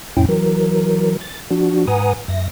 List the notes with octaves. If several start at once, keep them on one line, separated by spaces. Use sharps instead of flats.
F2 A2 C#4 E4 G5
E3 F#3 A#4
A6
F3 D4 F#4
G#2 B4 F#5 G#5 A#5 D#6
F#2 E5 A#6